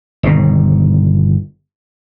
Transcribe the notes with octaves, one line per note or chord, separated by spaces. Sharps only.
G1 B2 D#3